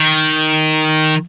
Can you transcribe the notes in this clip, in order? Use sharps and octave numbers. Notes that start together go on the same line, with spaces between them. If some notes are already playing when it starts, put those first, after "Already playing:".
Already playing: D#3